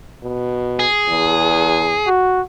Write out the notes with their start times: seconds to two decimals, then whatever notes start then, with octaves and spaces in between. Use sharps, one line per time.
0.23 B2
0.79 G#4
1.08 E2
2.07 F#4